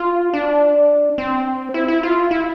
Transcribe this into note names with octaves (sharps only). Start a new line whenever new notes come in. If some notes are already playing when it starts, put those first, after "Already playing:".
Already playing: F4
D4
C4
E4
E4
F4
E4